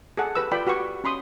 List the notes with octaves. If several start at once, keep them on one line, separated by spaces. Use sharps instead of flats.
G#4 A4 F#5
G4 B4 E6
F4 B4 D5 G5 B5
F#4 G4 B4 C#6
C#4 B5 C6 D#6